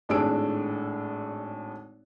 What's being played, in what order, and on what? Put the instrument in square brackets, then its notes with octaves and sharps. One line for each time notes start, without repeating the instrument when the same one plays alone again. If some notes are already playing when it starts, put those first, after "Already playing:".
[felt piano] G#1 A2 D4 G#4 E6 D7